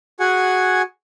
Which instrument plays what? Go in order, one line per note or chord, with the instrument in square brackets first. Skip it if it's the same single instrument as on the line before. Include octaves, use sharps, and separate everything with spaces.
[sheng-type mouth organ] F#4 G#4 F#5 G#5